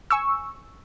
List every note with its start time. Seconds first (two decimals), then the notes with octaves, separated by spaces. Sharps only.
0.11 G#5 C#6 E6